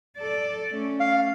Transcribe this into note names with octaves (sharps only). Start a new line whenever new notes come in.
A4 D5
A3 C#4
F5